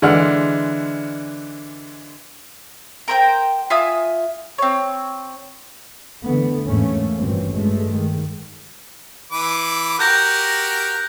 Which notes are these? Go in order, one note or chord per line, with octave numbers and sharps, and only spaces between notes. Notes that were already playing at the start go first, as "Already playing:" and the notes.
D3 E3 G#3 D4 F#5 F6
A#4 C5 G5
F4 E5 G#5 D#6
C4 C#5
D3 E3 A3 B3
E2 G#2 A3 A#3 C#4
G#1 G2 A#2 E3 C4 C#4
G2 B2 G#3 A3
D#3
E3 B4 D6
F#4 G4 A#4 F#6 G6 A#6